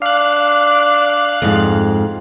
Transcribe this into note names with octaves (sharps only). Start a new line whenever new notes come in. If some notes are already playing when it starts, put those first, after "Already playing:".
D4 F5 F#6
F2 G#2